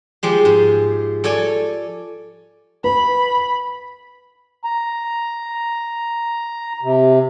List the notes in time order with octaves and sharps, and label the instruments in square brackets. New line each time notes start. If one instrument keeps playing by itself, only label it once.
[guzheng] F3 G#3 G4
G#2
A4 C#5 D5 G#5
[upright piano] B4 [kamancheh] B5
[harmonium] A#5
C3